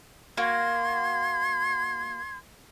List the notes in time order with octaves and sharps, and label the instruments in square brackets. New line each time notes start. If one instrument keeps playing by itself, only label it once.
[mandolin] A#3 F#4 [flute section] C6 G#6